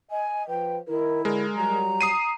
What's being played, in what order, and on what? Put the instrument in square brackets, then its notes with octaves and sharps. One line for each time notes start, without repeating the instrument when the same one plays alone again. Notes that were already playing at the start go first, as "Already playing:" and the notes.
[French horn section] D#5 [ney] G#5
[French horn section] F3 B4 [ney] G5
[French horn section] D#3 A#4 [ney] E4
[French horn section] D3 [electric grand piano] G#3 A#4
[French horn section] F#3 G3 [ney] A#5
[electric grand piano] D#6 C7 D#7